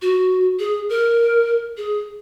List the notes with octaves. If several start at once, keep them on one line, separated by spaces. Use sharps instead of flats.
F#4
G#4
A#4
G#4